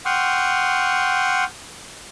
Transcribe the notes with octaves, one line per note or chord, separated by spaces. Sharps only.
F#5 G5 C6 C#6 D#6 F6